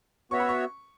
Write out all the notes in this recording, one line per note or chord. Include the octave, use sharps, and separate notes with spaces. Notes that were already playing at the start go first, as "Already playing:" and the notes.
B3 F#4 C#5 E5 C#6
B5
C#6